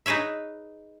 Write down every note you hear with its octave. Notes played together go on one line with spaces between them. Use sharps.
D#4 G#4 B4 C#5 E5